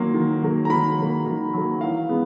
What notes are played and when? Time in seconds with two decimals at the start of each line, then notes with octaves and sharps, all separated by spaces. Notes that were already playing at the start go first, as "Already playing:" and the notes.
Already playing: D#3 F#3 A#3 C6
0.14 D#3
0.43 F#3 A#3
0.65 A#5
0.70 D#3 B5
0.98 F#3 A#3
1.26 D#3
1.53 F#3 A#3
1.81 E3 F5
2.09 G#3 B3